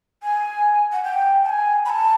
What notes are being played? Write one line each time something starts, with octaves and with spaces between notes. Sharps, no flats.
G#5
F#5
G5
A5
G#5
B5
A5